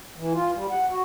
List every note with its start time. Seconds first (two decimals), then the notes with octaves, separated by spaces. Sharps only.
0.16 E3
0.34 F4
0.55 G3
0.70 F#5
0.90 F#4